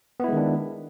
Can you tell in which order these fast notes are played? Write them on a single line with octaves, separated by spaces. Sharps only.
B3 E4 G#3 D#3 D4